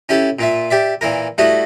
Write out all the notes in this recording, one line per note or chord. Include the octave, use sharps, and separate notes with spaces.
C#4 E4 G4 A4
A#2 F4 E5
G4 D5 E5
A#2 E3 A#4
G3 A3 E4 F#4 D#5